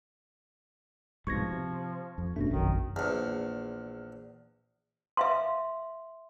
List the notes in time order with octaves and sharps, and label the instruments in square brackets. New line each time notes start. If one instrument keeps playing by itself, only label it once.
[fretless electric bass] C2 G#2 B2 [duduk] F3 [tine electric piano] C#6 G#6 A#6
[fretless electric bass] C3
F2
[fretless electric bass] G1 B2 A3 [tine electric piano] C#4 D4
[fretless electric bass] F1 F#3 [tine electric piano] A#1 F#2 [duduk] D#3
[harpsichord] A#1 E2
[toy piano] E5 F5 C6